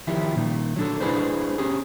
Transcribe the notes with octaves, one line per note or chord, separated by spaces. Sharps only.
D#3 F3 E4 G4
A#2 D#3
F#3 D4 A4
D4 E4 G#4 B4 C5
C#4 G4 G#4